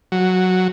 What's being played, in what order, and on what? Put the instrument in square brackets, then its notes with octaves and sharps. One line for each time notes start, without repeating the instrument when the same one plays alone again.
[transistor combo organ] F#3